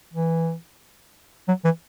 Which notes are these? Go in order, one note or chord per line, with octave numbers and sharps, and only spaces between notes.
E3
F#3
E3